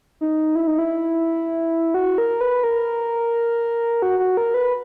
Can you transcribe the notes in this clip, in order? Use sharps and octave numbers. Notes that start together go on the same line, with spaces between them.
D#4
E4
D#4
E4
F#4
A#4
B4
A#4
F#4
F#4
A#4
B4